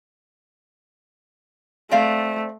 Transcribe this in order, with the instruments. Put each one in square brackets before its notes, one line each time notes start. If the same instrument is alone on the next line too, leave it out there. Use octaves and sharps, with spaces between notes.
[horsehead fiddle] A3 [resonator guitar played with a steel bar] C4 D5 F5